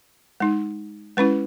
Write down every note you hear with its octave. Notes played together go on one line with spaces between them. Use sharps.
G#3 D#4
G#3 C#4 E4 B4